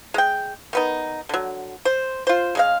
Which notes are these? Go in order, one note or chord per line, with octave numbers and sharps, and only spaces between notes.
G#3 G5
D#3 B3 D#4
D3 F#3
C5
F4 C5
C#3 G#3 F5